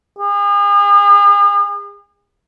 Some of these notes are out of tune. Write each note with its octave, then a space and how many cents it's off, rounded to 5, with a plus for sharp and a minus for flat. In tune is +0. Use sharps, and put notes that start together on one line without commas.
G#4 -40